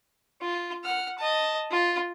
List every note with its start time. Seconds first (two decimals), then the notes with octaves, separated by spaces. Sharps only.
0.41 F4
0.84 F#5 F6
1.18 D#5 A5
1.71 F4